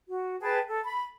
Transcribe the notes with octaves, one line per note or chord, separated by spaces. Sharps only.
F#4
G#4 B4 G5 A5
A4
B5